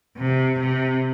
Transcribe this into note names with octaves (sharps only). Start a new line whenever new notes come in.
C3
C3